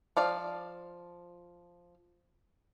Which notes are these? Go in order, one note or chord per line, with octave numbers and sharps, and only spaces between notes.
F3 D5 F5